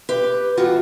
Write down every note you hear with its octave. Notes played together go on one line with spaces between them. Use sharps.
G4 B4
E3 G3 A3 B3 F4 F#4